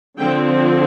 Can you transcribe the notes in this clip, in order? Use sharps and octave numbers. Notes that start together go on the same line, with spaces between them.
D3 F3 C4 G5